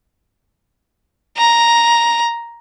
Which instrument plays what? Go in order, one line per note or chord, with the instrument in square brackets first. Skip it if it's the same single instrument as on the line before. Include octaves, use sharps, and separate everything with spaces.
[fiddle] A#5